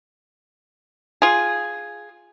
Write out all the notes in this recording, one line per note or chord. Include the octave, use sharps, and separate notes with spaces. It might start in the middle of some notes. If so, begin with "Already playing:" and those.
F4 G#4